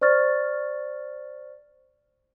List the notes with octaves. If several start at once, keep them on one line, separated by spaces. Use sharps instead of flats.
C5 D5 C#6 F6 A6